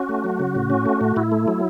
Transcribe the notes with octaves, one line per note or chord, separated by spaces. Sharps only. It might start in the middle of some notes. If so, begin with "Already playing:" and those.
Already playing: C#4 F#4
A3
F#3
C#3
A2
C#4
A3
A2
A2 E4
A3
F#3